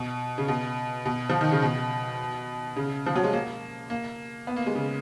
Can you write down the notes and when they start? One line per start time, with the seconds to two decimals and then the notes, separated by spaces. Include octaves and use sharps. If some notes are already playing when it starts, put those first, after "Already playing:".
Already playing: B2
0.38 C#3
0.48 B2
1.06 B2
1.29 F3
1.41 D#3
1.52 C#3
1.62 B2
2.76 C#3
3.06 F3
3.16 F#3
3.24 G#3
3.33 A#3
3.90 A#3
4.47 B3
4.56 A#3
4.67 G#3
4.75 C#3